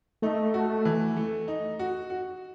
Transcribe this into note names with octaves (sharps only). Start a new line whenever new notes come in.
A3 D#4
F#4
E3
A3
D#4
F#4
F#4